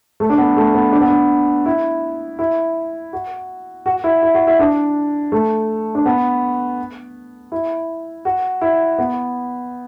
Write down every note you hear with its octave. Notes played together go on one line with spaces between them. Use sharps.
A3
D4
B3
A3
B3
D4
B3
D4
E4
E4
F#4
F#4
E4
E4
F#4
E4
D4
A3
D4
B3
E4
F#4
E4
B3